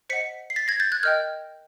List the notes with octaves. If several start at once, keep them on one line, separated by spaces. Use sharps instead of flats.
C5 D#5 F#5 B6 C#7
C7
A6 B6
G#6 A#6
G6 A6
F#6 G#6
A#4 D#5 G5 F6 G6